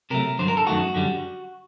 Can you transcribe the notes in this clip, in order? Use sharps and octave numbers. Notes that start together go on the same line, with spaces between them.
C3 F#3 A3 A#4
G2 D3 F#3 C5
A#4
A4
F#2 D#3 A3 F#4
F#2 D3 G3